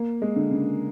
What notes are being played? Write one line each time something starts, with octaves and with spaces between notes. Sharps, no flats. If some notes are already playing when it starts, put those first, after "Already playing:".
Already playing: A#3
G#3
D3
C#3